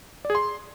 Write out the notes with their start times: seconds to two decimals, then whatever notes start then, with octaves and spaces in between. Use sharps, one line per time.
0.25 D5
0.30 G#4
0.35 C6